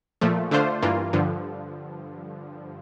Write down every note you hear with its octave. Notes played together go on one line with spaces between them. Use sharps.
A#2 F3 A3
D3 A3 D4 F4 C5
G2 E3 A#3 F4
G2 D3 F3